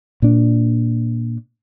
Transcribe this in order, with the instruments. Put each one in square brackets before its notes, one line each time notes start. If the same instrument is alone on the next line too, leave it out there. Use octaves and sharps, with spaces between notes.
[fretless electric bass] A#2 D4